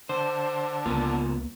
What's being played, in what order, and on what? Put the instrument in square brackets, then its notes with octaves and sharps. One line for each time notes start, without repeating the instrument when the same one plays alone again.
[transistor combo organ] D3 [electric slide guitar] C5
[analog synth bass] C#2 [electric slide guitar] C#3 B3 F4 [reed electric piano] A#3